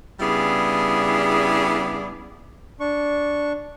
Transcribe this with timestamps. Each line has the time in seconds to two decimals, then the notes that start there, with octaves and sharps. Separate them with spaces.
0.20 C#3 G3 B3 D4 E4 G#4
2.80 D4 C#6